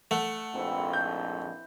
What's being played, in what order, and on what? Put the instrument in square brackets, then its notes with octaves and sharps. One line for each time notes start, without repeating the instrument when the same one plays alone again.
[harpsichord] A3 [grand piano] F#5
[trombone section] A#1 F2 G#2 [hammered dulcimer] C4 E4 B4
[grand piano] G6